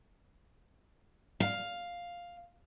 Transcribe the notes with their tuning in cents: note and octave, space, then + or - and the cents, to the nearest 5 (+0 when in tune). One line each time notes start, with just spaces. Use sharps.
F5 +5